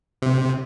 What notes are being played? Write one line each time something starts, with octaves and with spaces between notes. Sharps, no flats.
C3